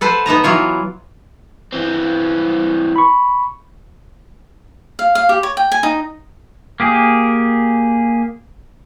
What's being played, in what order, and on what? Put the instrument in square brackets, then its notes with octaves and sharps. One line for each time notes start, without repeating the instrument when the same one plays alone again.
[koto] A4 B4 C5 F#5
B3 D#4 A5 A#5
E3 F#3 F4 C#5
[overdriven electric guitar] E3 C4
[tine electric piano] B5 C#6
[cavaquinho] F5
F5
G4
C#5
G5
G#5
D#4
[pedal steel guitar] A#3 G4 G#4